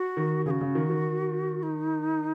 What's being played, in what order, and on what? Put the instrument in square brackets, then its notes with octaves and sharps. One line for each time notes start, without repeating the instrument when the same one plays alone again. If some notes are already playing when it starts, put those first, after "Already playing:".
Already playing: [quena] F#4
[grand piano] D#3
[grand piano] C#3 [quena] F#4 G#4
[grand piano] C#3
D#3
D#3
[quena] D#4